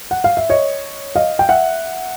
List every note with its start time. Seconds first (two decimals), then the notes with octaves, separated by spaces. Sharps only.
0.11 F#5
0.24 F5
0.37 E5
0.49 C#5 D#5
1.16 D#5 F5
1.39 G5
1.49 E5 F#5